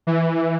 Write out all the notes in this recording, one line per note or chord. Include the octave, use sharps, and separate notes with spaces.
E3